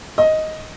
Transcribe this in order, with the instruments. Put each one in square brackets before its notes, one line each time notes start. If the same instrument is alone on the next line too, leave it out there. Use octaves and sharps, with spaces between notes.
[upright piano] D#5